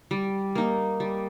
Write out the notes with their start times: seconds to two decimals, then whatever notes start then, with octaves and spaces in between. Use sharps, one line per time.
0.11 G3
0.55 A#3 D#4
1.00 G3